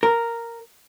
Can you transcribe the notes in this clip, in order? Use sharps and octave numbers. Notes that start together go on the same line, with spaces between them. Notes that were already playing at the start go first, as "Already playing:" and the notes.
A#4